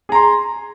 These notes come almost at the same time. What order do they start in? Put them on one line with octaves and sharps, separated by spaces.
G#4 A#5 C6